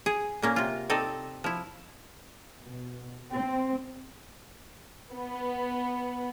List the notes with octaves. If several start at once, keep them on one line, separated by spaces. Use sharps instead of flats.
G#4
A#2 A#3 C#4
C3 F4
C4 D#4 A4 D5
F3 E4
B2
C4
B3